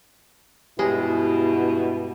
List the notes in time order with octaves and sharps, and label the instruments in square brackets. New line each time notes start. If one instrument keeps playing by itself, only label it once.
[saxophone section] G2 B2 [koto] G#3 [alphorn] E4 [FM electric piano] G4